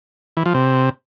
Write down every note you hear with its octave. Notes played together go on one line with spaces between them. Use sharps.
E3
F3
C3